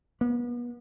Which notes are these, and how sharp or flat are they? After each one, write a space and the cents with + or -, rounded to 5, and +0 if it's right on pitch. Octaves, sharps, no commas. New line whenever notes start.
B3 -35